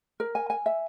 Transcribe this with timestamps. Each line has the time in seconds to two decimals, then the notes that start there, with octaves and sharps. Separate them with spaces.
0.20 A#4
0.35 G#5
0.50 G#5
0.66 E5